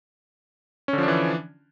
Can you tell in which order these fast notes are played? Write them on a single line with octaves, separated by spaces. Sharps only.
C#4 D3 F3 D4 E3